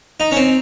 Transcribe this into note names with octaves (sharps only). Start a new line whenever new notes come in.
D#4
C#4
C4